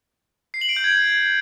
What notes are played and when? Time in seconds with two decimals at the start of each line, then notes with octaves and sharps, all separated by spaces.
0.54 C7
0.61 F#7
0.69 D7
0.76 G6
0.84 G#6